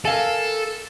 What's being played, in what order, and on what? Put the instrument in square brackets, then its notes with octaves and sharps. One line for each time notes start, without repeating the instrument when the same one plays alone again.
[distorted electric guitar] A4 [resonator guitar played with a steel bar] A#4 F5 G#5